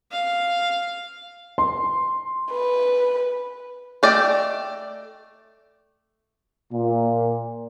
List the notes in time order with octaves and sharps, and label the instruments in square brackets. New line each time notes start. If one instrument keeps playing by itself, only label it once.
[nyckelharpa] F5
[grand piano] C6
[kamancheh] B4
[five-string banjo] A3 D5 D#5 G5
[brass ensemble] A#2